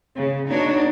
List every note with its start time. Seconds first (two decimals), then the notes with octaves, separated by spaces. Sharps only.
0.15 C#3
0.50 B3 D4 D#4 F#4 C#5